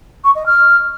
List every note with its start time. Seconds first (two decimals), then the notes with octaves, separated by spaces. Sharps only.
0.24 C#6
0.35 D#5
0.46 F6